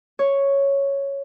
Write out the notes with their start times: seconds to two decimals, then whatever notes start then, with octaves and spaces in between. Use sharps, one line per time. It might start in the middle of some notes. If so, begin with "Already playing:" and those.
0.19 C#5